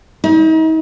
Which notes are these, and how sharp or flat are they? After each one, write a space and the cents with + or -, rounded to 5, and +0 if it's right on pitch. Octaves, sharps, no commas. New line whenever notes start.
D#4 +40